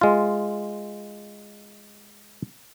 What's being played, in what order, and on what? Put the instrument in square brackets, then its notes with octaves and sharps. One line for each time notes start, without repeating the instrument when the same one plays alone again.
[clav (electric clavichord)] G#3 F4